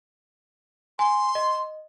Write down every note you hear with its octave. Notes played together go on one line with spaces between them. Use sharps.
G#5 C6
D#5